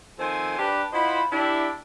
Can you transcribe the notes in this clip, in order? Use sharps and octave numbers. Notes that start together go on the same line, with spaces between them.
D#3 F3 C4 A4 G#5 C6
D4 G4 B4
E4 F4 C5 D#5 F#5 B5
D4 E4 G4